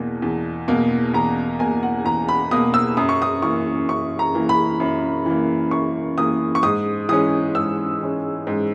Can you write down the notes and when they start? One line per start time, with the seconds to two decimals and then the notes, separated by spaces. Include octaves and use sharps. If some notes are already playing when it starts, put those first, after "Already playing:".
Already playing: E2 B2 A#3
0.22 E2
0.68 B2 A#3
1.14 E2 A#5
1.59 B2 A#3 G#5
1.83 F#5
2.05 E2 A#5
2.29 B5
2.51 B2 A#3 D#6
2.74 E6
2.97 F#2 D#6
3.09 C#6
3.22 D#6
3.42 E3 A#3 C#6
3.88 F#2 C#6
4.19 A#5
4.34 E3 A#3
4.49 B5
4.80 F#2
5.26 E3 A#3
5.71 F#2 C#6
6.18 E3 A#3 D#6
6.55 C#6
6.63 G#2 D#6
7.09 E3 G#3 C#4 D#6
7.55 G#2 E6
8.01 E3 G#3 C#4
8.47 G#2